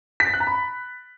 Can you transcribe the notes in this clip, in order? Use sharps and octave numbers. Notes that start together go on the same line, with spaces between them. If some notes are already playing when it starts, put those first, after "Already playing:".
B6
A6
F#6
A#5
B5